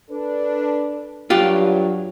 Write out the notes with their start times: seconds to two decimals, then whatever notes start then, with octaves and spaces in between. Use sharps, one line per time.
0.10 D4 A4 B4
1.30 G2 F#3 F4 G4